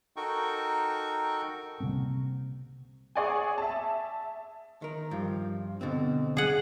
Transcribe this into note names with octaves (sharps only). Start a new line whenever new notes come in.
D#4 F#4 A4 A#4 G5 C#6
C3 G3 A#3 C4
G#4 C#5 D5 F#5 G#5
E5 A5
D#3 A#4
G2 F3
B2 D3 C4
G#4 F#5